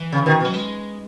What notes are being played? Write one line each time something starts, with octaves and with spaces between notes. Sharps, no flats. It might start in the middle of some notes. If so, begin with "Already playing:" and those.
Already playing: E3
C#3
B2 D#3
B2
F#3
G#3